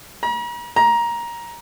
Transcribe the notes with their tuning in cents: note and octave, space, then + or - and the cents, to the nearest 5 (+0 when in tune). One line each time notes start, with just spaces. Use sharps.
A#5 +45
A#5 +15